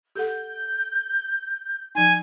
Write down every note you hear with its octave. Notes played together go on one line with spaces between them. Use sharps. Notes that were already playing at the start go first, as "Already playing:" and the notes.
G4 A4 F#5 G6
F3 D#4 G#5